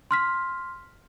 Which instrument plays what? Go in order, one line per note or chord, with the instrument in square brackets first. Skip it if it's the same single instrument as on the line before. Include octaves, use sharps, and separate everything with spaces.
[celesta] C6 F6 B6